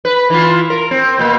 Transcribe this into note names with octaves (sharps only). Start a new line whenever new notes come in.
B4
E3 F4
A#4
C4
B2 A#3